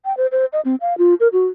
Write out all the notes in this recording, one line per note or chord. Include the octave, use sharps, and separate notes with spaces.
G5
C5
C5
D#5
C4
F5
F4
A#4
F#4